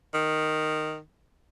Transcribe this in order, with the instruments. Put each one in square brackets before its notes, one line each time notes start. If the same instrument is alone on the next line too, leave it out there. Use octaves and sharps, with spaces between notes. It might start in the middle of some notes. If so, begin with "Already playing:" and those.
[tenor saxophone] D#3